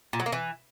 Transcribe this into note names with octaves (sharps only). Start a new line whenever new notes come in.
A#2
F#3
A#3
E3